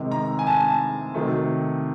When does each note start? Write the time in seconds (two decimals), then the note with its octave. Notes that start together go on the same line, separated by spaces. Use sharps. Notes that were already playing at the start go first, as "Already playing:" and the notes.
Already playing: C3 D#3 G#3
0.12 A#5
0.39 G#5
0.47 A5
1.14 C3 D#3 F#3 A3